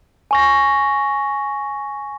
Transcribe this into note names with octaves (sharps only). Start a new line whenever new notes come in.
G#5 C#6 A#6